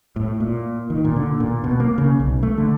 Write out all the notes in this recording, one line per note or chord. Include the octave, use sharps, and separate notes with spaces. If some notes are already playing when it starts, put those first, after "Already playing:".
A2
A#2
D#3
A#2
D3
A#2
B2
A#3
C#3
B1
A3
D3